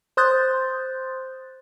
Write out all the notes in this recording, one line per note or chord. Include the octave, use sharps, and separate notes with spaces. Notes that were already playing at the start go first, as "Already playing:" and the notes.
C5 C6 D#6 F#6 G6 A6